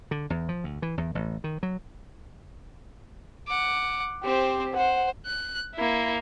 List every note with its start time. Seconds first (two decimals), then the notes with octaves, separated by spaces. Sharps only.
0.11 D3
0.30 E2
0.49 F3
0.64 D2
0.82 E3
0.98 E2
1.15 A1
1.44 D#3
1.63 F#3
3.48 F#5 D6
4.24 C4 G4 C5
4.77 C5 F#5
5.26 F#6
5.75 A#3 E4